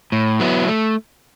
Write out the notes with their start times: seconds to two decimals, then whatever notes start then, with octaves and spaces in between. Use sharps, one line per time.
0.12 A2
0.40 F#3 B3 E4
0.68 A3